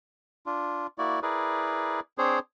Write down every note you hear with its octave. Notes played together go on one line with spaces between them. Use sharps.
D4 F4
A#3 E4 F#4 D5
E4 G#4 A#4 B4 D5
C4 D4 G#4 C5 C#5